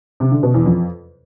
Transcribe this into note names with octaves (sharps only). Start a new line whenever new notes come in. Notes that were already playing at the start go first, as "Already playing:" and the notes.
C3
D3
B2
E2
F2